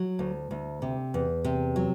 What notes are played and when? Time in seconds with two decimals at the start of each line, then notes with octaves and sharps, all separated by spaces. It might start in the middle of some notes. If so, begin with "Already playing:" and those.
Already playing: F#3
0.19 D2
0.51 D2
0.82 C3
1.14 E2
1.45 C3
1.76 F#3